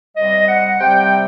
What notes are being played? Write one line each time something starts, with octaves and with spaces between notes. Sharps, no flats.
C3 G3 D#5
F#5
C3 G3 G5